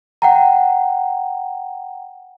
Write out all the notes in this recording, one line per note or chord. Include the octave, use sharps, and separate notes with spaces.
F#5 G5 A#5